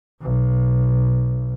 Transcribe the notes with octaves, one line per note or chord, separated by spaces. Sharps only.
B1